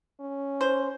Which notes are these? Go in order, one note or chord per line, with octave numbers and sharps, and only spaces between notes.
C#4
C5